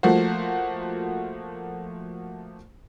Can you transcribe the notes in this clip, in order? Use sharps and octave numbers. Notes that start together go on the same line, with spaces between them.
F3 A3 A#3 F#4 C5